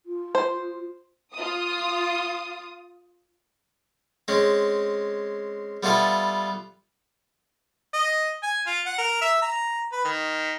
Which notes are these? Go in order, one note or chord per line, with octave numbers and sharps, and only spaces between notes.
F4
C5
F4 D#6
G#3 C4 C#4
G3 B3 E4 F4 A4 E5
D#5
G#5
F4
F#5
A#4
E5
A#5
B4
D#3